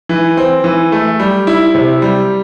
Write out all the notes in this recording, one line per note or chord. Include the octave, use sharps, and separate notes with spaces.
E3
C4
E3
A3
G3
E4
C3
G3